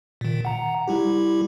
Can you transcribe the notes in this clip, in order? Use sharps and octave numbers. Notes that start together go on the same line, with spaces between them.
A#2 D#3
F#5 A#5
G3 E4 G4